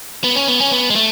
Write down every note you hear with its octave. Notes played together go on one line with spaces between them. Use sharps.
B3
C#4
B3
C#4
B3
G#3
A3